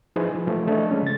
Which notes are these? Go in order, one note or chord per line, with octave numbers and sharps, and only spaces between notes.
F3 D#4 E4 G#4 B4 C5
F3
E3 F3 A3
A3 D4 D#5
G#3 C#4
C#3 A6